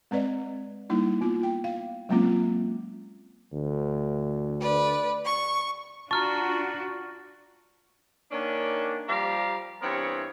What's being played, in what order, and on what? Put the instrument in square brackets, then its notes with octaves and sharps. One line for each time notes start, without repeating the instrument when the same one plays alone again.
[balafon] G#3 C4 B4 D5 D#5
G3 A#3 D#4 E4
B3 F4
G5
F5
F#3 G#3 A#3 C4 C#4 F4
[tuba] D2
[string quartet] B4 D5
C#6
[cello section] D4 F4 F#4 [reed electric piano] A5 A#5 [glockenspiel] C#6 F6 [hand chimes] A6
[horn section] D#3 A#3 C#4 D4
F3 G3 G4 F5 A#5
G2 E3 B3 C4 A#4 C#5